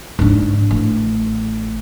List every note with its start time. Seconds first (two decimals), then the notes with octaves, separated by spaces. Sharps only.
0.19 G#2 D4
0.71 A1